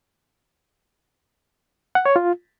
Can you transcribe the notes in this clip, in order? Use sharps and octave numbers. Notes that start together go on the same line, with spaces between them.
F#5
C#5
F4